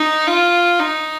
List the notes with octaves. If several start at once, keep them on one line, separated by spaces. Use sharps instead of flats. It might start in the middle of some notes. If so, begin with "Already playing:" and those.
Already playing: D#4
F4
D#4